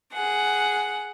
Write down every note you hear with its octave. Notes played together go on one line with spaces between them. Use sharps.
G#4 F#5